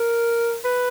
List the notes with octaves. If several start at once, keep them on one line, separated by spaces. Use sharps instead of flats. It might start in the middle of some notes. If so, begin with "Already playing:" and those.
Already playing: A#4
B4